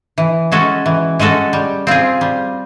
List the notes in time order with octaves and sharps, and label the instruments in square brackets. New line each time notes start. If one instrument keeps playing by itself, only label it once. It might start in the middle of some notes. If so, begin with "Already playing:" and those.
[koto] E3
G#3 C#4 F#4 A4
E3
G#3 C#4 F#4 A4
G3
C4 F4 G#4
G3